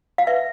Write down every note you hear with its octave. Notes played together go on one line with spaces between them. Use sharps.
F5
B4 E5